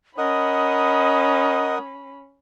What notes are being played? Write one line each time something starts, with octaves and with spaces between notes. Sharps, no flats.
C#4 A#4 D#5 F#5 B5 D#6